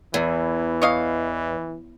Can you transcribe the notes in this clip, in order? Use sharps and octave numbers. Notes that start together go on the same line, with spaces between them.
E2 E3
C#5 D#5 F5